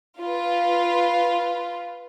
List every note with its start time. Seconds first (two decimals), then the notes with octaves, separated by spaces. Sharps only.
0.18 F4 B4